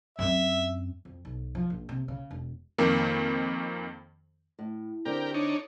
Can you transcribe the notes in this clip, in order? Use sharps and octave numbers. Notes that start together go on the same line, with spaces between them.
F#2 C4 E5
F2
B1
F3
A#1
C3
C#3
E1
F2 D#3 A#3
A2
D3 C4 G4 A#4
D4 D#4 C#5